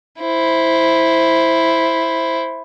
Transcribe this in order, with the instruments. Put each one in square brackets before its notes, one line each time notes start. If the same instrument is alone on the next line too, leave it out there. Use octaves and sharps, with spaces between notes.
[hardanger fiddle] E4 C5